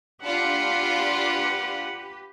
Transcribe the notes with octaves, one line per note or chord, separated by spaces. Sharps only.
D4 F4 G4 B4 F#5